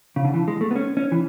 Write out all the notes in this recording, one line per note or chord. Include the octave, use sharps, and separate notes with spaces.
C#3
D3
E3
G#3
A3
B3
C#4
C#4
E3